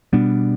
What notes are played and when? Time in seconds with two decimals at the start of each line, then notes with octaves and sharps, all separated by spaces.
0.13 B2 G3 B3 D4